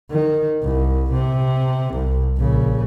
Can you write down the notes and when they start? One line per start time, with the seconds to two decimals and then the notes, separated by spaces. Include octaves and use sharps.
0.11 D#3
0.63 C2
1.12 C3
1.94 C2
2.37 A#1 C#3